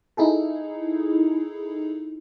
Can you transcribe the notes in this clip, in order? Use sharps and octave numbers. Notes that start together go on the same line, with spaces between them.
D#4 E4 G#4 A4